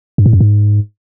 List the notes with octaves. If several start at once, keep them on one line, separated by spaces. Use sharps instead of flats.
G2
A2
F#2
G#2